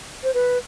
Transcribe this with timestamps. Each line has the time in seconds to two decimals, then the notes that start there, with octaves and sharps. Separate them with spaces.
0.23 C5
0.34 B4